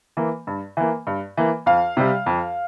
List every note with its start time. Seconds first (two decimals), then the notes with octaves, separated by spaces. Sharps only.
0.17 E3 A#3
0.47 G2
0.77 E3 A#3
1.07 G2
1.37 E3 A#3
1.66 F2 F5
1.97 C3 G3
2.26 F2